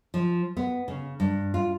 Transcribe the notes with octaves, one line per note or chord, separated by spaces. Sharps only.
F3
B3
C#3
G2
F4